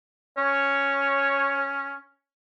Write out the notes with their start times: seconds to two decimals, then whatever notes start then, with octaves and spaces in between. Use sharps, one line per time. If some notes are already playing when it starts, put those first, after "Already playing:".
0.38 C#4 C#5